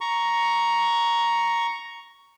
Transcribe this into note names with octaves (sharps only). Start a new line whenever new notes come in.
A#5 C#6